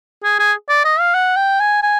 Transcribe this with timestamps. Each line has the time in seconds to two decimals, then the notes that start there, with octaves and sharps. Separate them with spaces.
0.24 G#4
0.39 G#4
0.69 D5
0.85 D#5
1.00 F5
1.14 F#5
1.36 G5
1.60 G#5
1.83 G#5